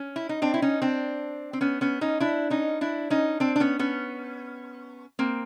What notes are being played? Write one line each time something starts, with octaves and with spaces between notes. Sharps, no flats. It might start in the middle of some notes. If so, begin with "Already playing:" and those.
Already playing: C#4
E4
D#4
C4 D4
E4
C#4 D#4
C4 D4
C4
B3 C#4
B3 C#4
C#4 D#4
D4 E4
C#4 D#4
D4 E4
C#4 D#4
C4 D4
D4
B3 C#4
B3 C#4
A#3 C4